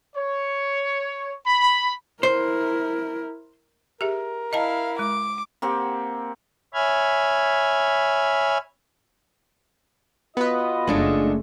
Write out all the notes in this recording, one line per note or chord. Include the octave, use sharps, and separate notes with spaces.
C#5
B5
E4 A#4 C5
G4 G#4 A#4 E5
E4 D#5 F5 A5 A#5
G#3 D6
A#3 C4 G4 F#5
C#5 E5 G#5 B5 F6 G#6
B3 F4 F#4 B4 D#5
F#1 G#3 A3 C#4 D4 A4